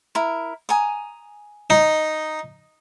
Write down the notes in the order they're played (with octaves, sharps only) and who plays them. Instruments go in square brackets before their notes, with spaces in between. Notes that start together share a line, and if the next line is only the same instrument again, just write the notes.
[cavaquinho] E4 A#4
G#5 A#5 D#6
[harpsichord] D#4